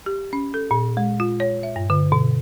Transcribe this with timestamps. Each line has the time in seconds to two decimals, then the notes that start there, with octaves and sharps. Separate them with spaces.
0.06 G4
0.33 C#4
0.54 A4
0.71 A#2
0.97 G#3
1.20 F4
1.40 C#5
1.63 E5
1.76 G2
1.90 D3
2.12 B2